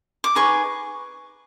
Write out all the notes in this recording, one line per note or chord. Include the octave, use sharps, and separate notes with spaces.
D6
D#4 G#4 B4 C#6